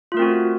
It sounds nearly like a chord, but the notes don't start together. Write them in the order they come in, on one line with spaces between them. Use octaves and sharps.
F4 A3 A#4 C4 F#4